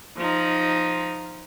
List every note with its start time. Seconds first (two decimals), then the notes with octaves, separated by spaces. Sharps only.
0.17 F3 D#4